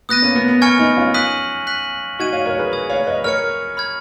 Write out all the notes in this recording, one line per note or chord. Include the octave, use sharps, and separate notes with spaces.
B3 D#6 F#6 A#6 D#7
A#3 C#4
B3
B3
G#5 C#6 F6 G#6 C#7
B3 D#4
C#4 F4
D#6 F#6 B6 D#7 F#7
F#6 B6 D#7 F#7
D#4 F#4 C#6 G#6 D#7
C#5 F5
A#4 C#5
G#4 B4
B5 D#6 G#6
C#5 F5
B4 D#5
A#4 C#5 F6 G#6 C#7
B5 F6 G#6